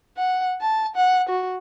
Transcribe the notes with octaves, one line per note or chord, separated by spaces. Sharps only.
F#5
A5
F#5
F#4